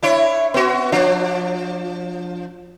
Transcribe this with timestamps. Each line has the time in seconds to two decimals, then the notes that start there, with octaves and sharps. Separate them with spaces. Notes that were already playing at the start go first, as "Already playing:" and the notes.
0.03 D4 E4 C#5
0.54 B3 F#4
0.92 F3 D4